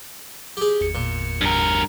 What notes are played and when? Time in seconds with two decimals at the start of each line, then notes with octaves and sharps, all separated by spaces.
0.57 G4 G#4
0.81 G#1 E2 C#7
0.95 A#2
1.41 G2 A#4